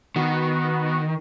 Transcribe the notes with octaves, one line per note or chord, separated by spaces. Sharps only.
D#3 B3 F#4